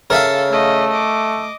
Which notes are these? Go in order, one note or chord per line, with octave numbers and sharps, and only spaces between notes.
C#3 A4 A#4 E5 F5
A3 D#5
D#5 D6